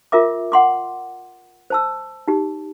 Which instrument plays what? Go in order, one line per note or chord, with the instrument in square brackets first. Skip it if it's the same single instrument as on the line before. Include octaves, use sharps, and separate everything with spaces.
[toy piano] F4 A#4 E5 D6
F#5 C6 D6
C5 A5 E6
D#4 G4